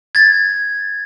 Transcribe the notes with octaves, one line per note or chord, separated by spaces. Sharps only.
G#6 A6